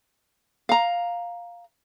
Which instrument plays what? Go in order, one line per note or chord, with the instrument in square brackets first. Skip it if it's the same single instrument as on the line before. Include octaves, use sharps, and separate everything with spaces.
[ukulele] F5 A#5